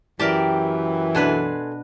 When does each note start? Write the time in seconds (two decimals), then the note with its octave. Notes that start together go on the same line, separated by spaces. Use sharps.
0.20 F#2 E3 G4 A#4 D5 A5
1.15 B2 A3 D4 B4 G#5 C6